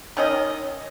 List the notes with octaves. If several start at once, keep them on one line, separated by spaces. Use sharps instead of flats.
D#3 C#4 D#5